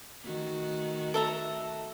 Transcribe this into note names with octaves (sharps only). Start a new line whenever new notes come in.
D#3 A3 F#4
A4 E5 A#5